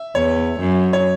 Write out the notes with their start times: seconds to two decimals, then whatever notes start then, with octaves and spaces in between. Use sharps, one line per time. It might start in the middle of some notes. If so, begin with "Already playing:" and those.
Already playing: E5
0.15 E2 C#5
0.60 F#2
0.93 C#5